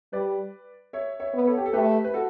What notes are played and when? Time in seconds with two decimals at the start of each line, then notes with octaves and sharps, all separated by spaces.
0.13 G3 B4 D5
0.93 C#5 E5
1.20 C#5 E5
1.34 B3
1.47 A4 C#5
1.58 G4
1.66 A4
1.73 A3 G4 B4
2.04 B4
2.14 F#4 A4